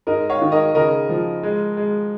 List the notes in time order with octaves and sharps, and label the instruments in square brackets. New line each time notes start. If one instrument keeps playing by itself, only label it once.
[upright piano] G#2 A#4 D#5
C#5 F5
D#3
A#4 D#5
C#3 A#4 D#5
F3
G#3
G#3